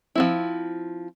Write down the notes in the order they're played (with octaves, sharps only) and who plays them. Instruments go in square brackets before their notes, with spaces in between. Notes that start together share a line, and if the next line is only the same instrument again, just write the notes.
[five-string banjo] F3 C4 E4